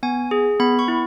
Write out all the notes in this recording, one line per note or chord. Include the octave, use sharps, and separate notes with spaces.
B3 G#5
G#4
B3 B5
C#6
E4